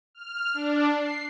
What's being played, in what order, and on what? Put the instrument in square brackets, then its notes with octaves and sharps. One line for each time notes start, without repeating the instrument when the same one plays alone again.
[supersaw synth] F6
D4
C7